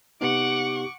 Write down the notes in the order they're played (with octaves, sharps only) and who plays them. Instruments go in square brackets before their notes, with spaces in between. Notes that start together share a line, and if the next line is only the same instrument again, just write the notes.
[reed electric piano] C3 B3 D#4 [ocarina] G4 [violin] F#5 [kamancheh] C#6 D6